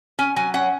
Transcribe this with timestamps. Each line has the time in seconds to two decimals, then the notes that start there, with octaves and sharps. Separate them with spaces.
0.19 C#4 G#5
0.36 F#3 G#5
0.54 C#4 F#5